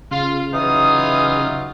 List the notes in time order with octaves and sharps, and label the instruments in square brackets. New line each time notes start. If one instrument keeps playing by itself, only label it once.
[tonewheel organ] C#3 F6 [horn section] F4
[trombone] E3 [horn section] F#3 D#4 F4 [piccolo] D#6